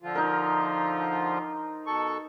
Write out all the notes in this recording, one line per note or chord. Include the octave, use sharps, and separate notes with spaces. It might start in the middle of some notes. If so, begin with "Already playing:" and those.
D3 F3 F4
D#4 A#4
B2 A4 C#6